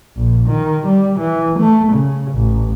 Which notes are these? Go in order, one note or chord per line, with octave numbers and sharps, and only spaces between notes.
A#1
D#3
G3
E3
A3
C#3
A1